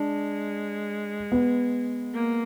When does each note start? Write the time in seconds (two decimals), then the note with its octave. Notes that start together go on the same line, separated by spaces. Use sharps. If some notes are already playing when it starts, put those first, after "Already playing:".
Already playing: G#3 D4
1.32 B3
2.14 A#3